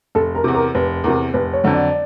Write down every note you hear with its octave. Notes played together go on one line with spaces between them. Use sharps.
F1 A4
A#4
E2 C3
A#4
F1 B4
E2 C3 A#4
F1 B4
C#5
F2 D3 F#3
D5